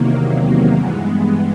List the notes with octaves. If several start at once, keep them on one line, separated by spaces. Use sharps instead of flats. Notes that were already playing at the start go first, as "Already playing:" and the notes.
Already playing: E2 C3 D#3 F#3 A#3
G2 E3 G#3 B3